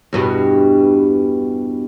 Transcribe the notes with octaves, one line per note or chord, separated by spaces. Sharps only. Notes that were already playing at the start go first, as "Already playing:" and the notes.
E2 G2 B2